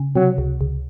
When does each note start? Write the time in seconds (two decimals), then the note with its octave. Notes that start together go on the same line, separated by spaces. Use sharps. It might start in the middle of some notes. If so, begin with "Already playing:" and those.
Already playing: C#3
0.16 C3 F#3
0.38 C#2
0.61 C#2